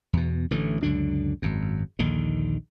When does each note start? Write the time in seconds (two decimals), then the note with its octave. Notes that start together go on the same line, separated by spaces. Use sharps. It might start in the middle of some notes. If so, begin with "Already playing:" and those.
0.13 E2 B2
0.51 A1 D3 E3 A3
0.83 C#2 F#2 D3 D4
1.42 G#1 F#2
1.99 A#1 D#2 D3 D#3